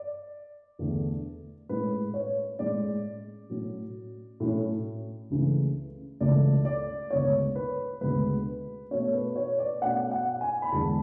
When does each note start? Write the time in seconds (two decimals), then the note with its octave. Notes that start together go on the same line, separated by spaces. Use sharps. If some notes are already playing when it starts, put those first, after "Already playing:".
Already playing: D5
0.79 E2 D3 A3
1.69 A2 G#3 C#4 B4
2.14 C#5
2.59 A2 G#3 C#4 D5
3.50 A2 F#3 C#4
4.40 A2 F#3 C#4
5.30 C#2 C#3 E3 A3
6.20 C#2 C#3 E3 A3 D5
6.65 D5
7.10 D2 C#3 G#3 B3 C#5
7.56 B4
8.00 D2 C#3 G#3 B3 B4
8.91 B2 A3 C#4 C#5
9.14 B4
9.36 C#5
9.59 D5
9.81 B2 A3 C#4 F#5
10.11 F#5
10.41 G#5
10.62 B5
10.71 E2 D3 G#3 A5